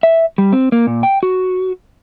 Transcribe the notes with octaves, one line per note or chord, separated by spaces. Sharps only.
E5
G3
C4
A#3
A#2
G5
F#4